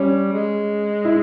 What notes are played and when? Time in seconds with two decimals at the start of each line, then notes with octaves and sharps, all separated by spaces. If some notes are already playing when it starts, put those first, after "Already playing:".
Already playing: G3 C#4
0.33 G#3
1.05 E4